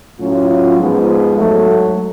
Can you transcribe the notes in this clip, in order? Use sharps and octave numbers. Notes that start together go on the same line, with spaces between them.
A2 F#3 C#4 F4
G#2 F3 G#3 B3
G#2 F#3 A3